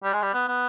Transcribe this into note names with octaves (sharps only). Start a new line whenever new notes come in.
G3
G#3
G3
B3
B3